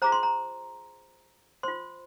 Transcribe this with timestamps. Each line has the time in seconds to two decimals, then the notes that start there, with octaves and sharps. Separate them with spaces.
0.02 F4 G#4 C5 A#5
0.12 C6
0.23 A#5
1.63 F4 C5 C6